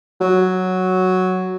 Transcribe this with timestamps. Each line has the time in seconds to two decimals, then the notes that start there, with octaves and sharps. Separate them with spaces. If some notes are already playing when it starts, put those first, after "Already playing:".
0.21 F#3